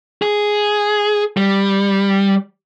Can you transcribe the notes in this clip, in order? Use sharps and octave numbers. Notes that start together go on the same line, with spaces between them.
G#4
G3